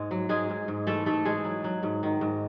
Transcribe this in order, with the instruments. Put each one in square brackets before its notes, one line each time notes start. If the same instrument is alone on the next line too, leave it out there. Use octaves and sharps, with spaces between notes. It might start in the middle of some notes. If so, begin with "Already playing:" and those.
Already playing: [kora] G#2 G#3
F#3
G#2 G#3 G#4
G#2
G#2
E3 A3 A4
G#2 A3 A4
E3 G#3 G#4
F#3
F#3
G#2
D#3
G#2